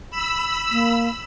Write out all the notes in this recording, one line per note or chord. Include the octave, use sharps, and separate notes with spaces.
B5 E6
A#3